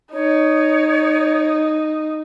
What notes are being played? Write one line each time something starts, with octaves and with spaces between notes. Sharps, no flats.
D#4 C#5